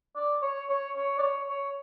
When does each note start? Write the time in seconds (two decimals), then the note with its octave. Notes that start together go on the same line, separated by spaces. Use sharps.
0.16 D5
0.42 C#5
0.69 C#5
0.96 C#5
1.18 D5
1.22 C#5
1.50 C#5